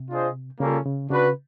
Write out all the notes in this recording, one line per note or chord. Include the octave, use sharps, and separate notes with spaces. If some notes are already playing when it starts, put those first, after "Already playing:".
Already playing: C3
D4 F4 G#4 C5 D#5
C#3 G3 A#3 C#4 F4 A4
C#3
C#3 D4 F#4 B4